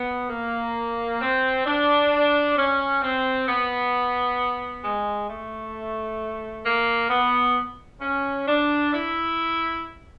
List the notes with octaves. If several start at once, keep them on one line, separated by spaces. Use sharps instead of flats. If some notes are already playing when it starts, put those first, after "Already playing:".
Already playing: B3
A#3
C4
D4
C#4
C4
B3
G#3
A3
A#3
B3
C#4
D4
E4